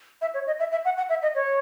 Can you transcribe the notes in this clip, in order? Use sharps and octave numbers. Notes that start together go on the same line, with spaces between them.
E5
C#5
D#5
E5
E5
F#5
F#5
E5
D#5
C#5